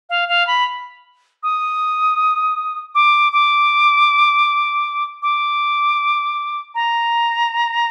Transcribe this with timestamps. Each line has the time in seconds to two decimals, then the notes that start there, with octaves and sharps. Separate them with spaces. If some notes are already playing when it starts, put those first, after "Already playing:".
0.10 F5
0.28 F5
0.47 B5
1.43 D#6
2.95 D6
3.33 D6
5.22 D6
6.75 A#5